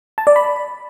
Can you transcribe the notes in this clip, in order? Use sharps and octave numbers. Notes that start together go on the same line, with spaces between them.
A5
D5
B5